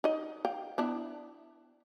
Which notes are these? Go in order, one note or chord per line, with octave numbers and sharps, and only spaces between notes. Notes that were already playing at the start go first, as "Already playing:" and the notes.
D#4 D#5
F5 G5
B3 D4 E4